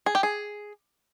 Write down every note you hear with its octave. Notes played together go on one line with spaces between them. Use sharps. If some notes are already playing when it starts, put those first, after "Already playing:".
G#4
G4
G#4